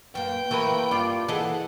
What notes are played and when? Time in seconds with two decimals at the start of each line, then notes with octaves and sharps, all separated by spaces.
0.15 F#2 A#3 B4 G5
0.51 E3 A3 A#3 A#4 B4
0.91 G2 F4 D5
1.28 E3 G#4 A4 D#5 F#5